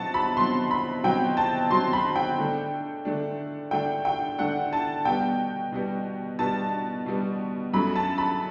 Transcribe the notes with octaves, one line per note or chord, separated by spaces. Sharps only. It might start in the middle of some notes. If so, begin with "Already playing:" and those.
Already playing: B2 F#3 C4 F#5 A5
B5
B2 F#3 C4 C6
B5
B2 F#3 C4 G5
A5
B2 F#3 C4 C6
B5
G5
D3 A3 D4
D3 A3 D4
D3 A3 D4 G5
G5
D3 A3 D4 F#5
A5
B2 G3 B3 G5
B2 G3 B3
B2 G3 B3 A5
B2 G3 B3
F#2 F#3 A3 B5
A5
B5